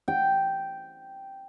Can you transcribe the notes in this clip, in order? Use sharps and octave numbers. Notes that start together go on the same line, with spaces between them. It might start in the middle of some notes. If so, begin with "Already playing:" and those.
G5